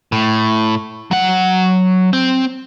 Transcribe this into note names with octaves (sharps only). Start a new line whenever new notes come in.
A2
F#3 F#5
C4